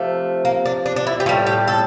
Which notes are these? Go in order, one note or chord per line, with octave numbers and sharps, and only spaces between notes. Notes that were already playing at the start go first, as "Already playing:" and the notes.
Already playing: C3 F3 A3
A#3
D4
D4
D4
E4
G4
A2 G3 F4
G4
A4